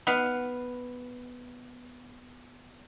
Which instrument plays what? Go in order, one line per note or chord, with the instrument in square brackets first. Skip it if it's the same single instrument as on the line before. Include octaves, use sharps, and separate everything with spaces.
[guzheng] B3 B4 F5